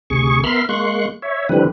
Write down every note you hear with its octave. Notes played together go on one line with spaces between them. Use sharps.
D2 C3 G#4 C#6
B3 A#4 E5 B5 C6 F6
G#3 A#3 C6 C#6 F#6
C#5 E5
D3 E3 F3 G3 C4 B4